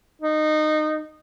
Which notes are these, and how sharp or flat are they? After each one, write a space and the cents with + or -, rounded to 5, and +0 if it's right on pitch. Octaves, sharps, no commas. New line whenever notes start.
D#4 -20